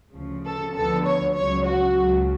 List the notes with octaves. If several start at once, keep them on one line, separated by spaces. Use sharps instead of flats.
D2 C#3 F3
A4
D2 D3 F3 B3 A4
C#5
C#2 C#3 F#3 C#5
F#4
C#2 C#3 F#3